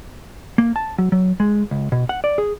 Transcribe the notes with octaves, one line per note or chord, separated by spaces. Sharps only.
A#3
A5
F#3
F#3
G#3
C#2
B2
F#5
D5
G#4